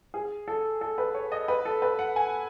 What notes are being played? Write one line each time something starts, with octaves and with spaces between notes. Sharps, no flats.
G#4
A4
A4
B4
C#5
D#5
B4
A4
B4
F#5
G#5